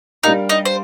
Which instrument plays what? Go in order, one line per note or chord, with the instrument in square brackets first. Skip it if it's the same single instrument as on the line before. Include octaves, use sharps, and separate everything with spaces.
[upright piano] G3 D4 G4 A#4 F5 [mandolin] D#4
[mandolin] D#4
C5